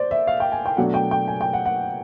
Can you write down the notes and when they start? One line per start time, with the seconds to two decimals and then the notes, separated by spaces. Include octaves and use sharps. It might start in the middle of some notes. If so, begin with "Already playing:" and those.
Already playing: C5 D5
0.11 E5
0.27 F5
0.40 G5
0.52 G#5
0.66 G5
0.77 B2 F#3 A3 D4 F#5
0.94 G5
1.11 G5
1.28 G#5
1.41 G5
1.53 F#5
1.66 F#5